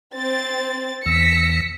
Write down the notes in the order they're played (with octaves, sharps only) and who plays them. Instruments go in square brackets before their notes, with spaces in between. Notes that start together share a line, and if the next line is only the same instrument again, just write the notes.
[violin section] C4 A6
[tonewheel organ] E2 E6 A#6 [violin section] B6 C#7